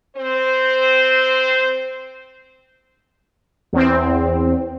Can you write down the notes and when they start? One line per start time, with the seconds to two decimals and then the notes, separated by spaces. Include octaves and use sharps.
0.16 C4 C5
3.73 E2 C4